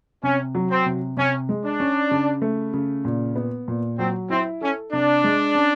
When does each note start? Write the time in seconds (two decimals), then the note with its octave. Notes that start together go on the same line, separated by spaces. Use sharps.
0.23 C3 C#4
0.55 F#3
0.70 C4
0.86 C3
1.17 C3 C#4
1.49 G#3
1.64 D4
1.80 C#4
2.11 C#3
2.42 A3
2.74 C#3
3.05 A#2
3.36 B3
3.68 A#2
3.99 F#3 C4
4.30 C4 E4
4.61 C#4 A4
4.92 C3 D4
5.24 G#3
5.55 C#4